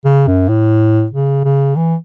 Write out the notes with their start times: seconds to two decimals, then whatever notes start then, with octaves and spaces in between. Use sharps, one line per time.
0.05 C#3
0.27 F#2
0.49 A2
1.12 C#3
1.45 C#3
1.76 E3